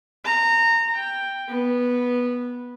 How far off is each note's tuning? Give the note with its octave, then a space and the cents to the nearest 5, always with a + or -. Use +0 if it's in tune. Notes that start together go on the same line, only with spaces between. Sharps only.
A#5 -25
G5 +5
B3 -10